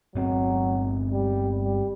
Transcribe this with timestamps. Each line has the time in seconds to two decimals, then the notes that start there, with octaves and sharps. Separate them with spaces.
0.15 G1 F#3 C4
1.12 G3
1.59 G3